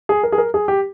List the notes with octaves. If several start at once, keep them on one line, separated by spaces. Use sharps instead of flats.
G#4
A#4
G#4
A#4
G#4
G4